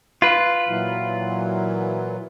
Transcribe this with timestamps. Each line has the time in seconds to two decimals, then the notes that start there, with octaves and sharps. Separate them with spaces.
0.22 F4 B4
0.67 A#2 E3 F#3